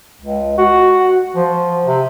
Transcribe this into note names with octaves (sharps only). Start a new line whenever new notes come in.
C#2
F#4
F3
C3